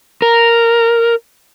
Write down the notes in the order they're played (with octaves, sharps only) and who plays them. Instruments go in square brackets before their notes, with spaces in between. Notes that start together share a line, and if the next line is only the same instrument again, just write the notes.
[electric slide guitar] A#4